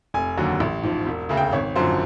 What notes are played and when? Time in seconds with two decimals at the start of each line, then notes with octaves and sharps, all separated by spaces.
0.14 F1 G#5
0.37 D#2 D3 F#3
0.60 A1
0.83 G#2 F3
1.06 E1
1.29 D2 C#3
1.37 G5
1.52 G#1 C#5
1.75 F#2 D3 F3 C5